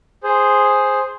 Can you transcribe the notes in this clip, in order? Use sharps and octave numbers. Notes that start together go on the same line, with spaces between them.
G#4 C5